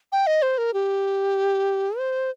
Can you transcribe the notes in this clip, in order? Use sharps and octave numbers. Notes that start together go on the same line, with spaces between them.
G5
D#5
C5
A#4
G4
C5